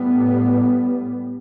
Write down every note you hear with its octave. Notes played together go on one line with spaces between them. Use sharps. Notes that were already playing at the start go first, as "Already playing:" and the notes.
Already playing: A2 G3 B3